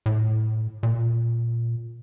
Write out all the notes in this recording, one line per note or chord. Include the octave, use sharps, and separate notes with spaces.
A2
A#2